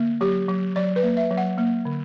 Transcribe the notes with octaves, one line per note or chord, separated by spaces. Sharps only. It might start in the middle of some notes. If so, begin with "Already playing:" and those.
Already playing: D3 A#3
F#3 G4
F#3
F#3 D5
B4
A#3
E5
F#3
F#5
A#3
D3